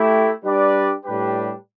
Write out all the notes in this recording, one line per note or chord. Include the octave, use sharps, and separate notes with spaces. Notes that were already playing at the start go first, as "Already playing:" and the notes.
Already playing: A3 E4 G4
G3 D4 G4 B4 D5
A2 G3 D4 G4 B4